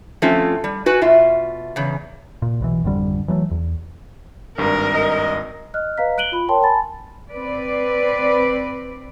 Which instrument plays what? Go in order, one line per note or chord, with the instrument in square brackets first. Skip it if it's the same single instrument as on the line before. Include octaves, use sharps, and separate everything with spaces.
[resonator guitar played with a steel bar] F3 A3 C4 C#4 F4
G3
F#4 B4 G#5
B2 F4 E5
E2 C#3
[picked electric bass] A#2
B1 B2 E3
G#1 F2 D3 G3
E3 F#3 G#3 A3
E2
[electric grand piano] G#1 G2 [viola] A#4
[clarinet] D#5
[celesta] D#5 F6 F#6
B4 D#5 F5 A#5 B6
F#6 D7 D#7 F#7 G7
F4 B5
A#4 C#5 G5 A5 C6
G#5 A5 B5 A6
[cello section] C4 B4 D5